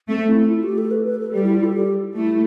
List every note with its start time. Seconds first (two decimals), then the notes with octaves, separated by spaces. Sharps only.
0.08 A3 C4
0.29 E4
0.50 F4
0.63 G4
0.78 A4
0.91 B4
1.06 B4
1.20 A4
1.33 G3 G4
1.43 E4
1.54 F4
1.64 A4
1.75 G4
2.16 A3 E4